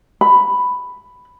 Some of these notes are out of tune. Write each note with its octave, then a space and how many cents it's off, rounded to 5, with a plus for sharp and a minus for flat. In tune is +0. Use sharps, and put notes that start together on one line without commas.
B5 +5